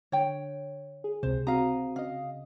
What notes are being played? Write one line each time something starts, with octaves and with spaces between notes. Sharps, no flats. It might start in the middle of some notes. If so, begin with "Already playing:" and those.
D3 C#5 G5
G#4
C#2 C3 C5
C4 F#4 F5 A#5 D#6
C#3 D#5 F5